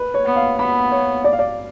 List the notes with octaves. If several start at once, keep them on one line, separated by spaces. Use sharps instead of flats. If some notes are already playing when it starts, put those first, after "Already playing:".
Already playing: B4
C#5
B3
F5
B3 B5
C#5
D5
F5
D5